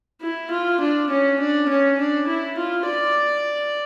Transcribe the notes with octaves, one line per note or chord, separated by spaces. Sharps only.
E4
F4
D4
C#4
D4
C#4
D4
E4
F4
D5